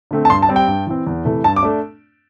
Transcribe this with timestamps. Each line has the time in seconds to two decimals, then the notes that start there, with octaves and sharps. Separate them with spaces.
0.11 D3 A3 C4
0.25 A5
0.30 G2 C6
0.43 A5
0.49 G3 C4
0.56 G5
0.67 G2
0.87 E3 C4
1.07 E2
1.25 C3 E3 A3
1.44 G2 A5
1.56 D6
1.63 A3 D4